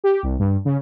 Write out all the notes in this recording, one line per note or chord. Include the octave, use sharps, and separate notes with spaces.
G4
C2
G2
C#3